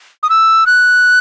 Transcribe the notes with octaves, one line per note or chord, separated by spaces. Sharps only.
D#6
E6
F#6